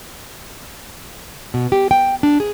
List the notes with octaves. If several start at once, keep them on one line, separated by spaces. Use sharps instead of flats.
B2
G4
G5
D4
G#4